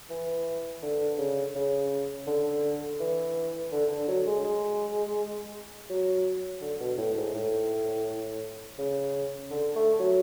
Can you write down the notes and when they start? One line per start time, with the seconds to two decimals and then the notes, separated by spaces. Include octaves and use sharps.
0.10 E3
0.83 D3
1.18 C#3
1.55 C#3
2.27 D3
3.00 E3
3.72 D3
3.91 D3
4.08 F#3
4.26 G#3
4.44 G#3
5.89 F#3
6.61 D3
6.80 B2
6.97 A2
7.16 G#2
7.34 A2
8.79 C#3
9.51 D3
9.75 A3
10.00 F#3